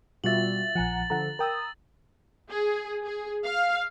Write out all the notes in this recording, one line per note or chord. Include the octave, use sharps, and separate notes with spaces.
B2 G3 F4 F#4 E5 A6 F#7
A#1 F3 F#5 G#5 A#5
D3 F3 A4 F#5 A#5
A#4 G5 A#5 D#6 E6
G#4
G#4
F5